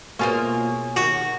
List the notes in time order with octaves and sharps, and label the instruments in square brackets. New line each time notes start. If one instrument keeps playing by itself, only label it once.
[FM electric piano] B2 G#4 C#5 [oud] A#3 F4 C5
[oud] D#3 [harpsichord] F#4